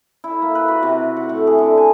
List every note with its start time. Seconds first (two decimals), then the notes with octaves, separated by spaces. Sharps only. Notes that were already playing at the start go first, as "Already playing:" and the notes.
0.24 E4
0.42 A#3
0.55 B4
0.68 F#4
0.83 C3
1.17 F#5
1.29 A2
1.47 G#4
1.58 D3
1.78 G#5